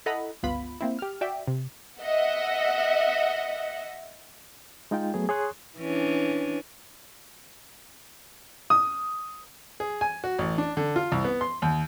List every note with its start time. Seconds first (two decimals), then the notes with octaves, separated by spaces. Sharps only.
0.06 E4 A4 D#5 F#5 A#5 B5
0.43 G1 C#2 B3 F4 B5
0.81 A#3 C4 E4
0.99 G4 F6
1.21 F#4 D5 E5 G5
1.47 C3
2.02 D#5 E5 F#5
4.91 G#3 D#4 F4 G5
5.14 F#3 A3 B3 G#4
5.29 G#4 C#5 C6 C#6 D#6 F#6
5.79 E3 C#4 D4
8.70 D#6
9.80 G#4
10.01 G#5
10.24 F#4
10.38 A1
10.58 D4
10.77 D3
10.96 F4
11.12 C2
11.24 B3
11.41 C6
11.62 D#2